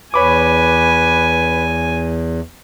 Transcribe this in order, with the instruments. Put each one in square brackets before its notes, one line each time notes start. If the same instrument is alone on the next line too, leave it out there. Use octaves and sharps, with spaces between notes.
[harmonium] E2 [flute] B4 [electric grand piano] C#5 B5 D6 [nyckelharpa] G#5